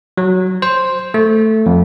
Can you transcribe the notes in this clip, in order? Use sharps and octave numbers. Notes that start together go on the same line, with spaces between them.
F#3
C5
A3
F2